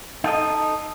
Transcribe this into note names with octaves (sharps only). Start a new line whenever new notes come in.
D#4 A4 D#5